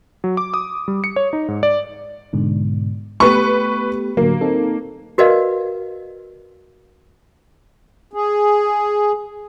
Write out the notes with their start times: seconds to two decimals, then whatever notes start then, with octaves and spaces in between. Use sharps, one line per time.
0.24 F#3
0.37 D6
0.54 D#6
0.88 G3
1.04 C#7
1.16 C#5
1.33 D#4
1.48 G#2
1.63 D5
2.33 G#2 B2 D3
3.20 A3 B3 G4 B4 C#6
4.17 A2 D3 F#3 A#3
4.41 C4 D#4 A4
5.18 F#4 A#4 B4 D5 D#5 F5
8.14 G#4